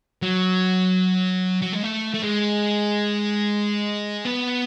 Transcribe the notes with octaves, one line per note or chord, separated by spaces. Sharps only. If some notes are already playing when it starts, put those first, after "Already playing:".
F#3
F#3
G#3
A3
A3
G#3
B3